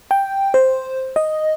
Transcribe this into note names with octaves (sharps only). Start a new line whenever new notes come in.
G5
C5
D#5